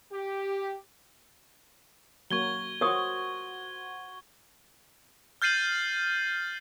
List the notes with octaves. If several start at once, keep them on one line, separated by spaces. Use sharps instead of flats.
G4
F#3 A#3 C#6 G#6 G7
F#4 A#4 C5 C#5 D#6
F6 G6 A6 C7 D#7 F#7